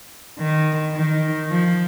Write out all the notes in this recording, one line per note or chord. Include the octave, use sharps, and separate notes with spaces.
D#3
D#3
F3